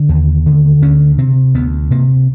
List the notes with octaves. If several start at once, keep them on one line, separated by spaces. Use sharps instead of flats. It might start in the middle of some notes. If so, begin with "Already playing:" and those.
Already playing: D3
D#2
D3
D2 C#4
C3 C4
D2 B3
C3 A#3